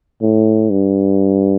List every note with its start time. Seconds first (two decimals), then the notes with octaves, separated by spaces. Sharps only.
0.22 A2
0.71 G2